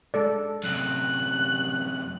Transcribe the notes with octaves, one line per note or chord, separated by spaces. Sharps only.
G#3 A4 D5
F#2 C3 F#6